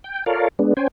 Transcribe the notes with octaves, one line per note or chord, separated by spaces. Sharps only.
G5
F4 A4 A#4 C#5 D5 F5
G#3 B3 D4
C#4 C5 G5 G#5